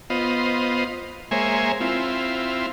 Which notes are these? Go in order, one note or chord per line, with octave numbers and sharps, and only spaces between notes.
B3 F4 C5 D#5
G#3 A#3 C5 C#5 E5 G#5
C4 E4 F4